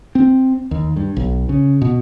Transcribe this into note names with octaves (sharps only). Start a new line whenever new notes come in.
C4
D#2
G2
B1
C#3
B2